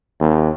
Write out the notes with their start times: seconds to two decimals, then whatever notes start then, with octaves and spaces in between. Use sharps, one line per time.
0.20 D#2